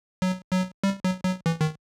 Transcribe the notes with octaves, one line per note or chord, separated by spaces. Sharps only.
F#3
F#3
G3
F#3
F#3
E3
D#3